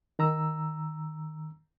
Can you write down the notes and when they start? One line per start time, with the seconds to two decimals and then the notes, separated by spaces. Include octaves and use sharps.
0.19 D#3 A#5 E6